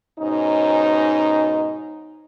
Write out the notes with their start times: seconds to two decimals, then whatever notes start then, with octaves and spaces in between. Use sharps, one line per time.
0.19 G#2 B2 C#4 D#4